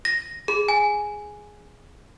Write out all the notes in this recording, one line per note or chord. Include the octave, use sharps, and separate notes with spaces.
A#6
G#4
G#5